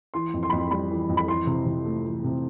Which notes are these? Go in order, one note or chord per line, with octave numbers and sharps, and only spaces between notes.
E3 C6
F2
C6
B5
F2
C6
G3 B5
E3
F2
B5
E3 C6
C3
C3
A3
E3
C3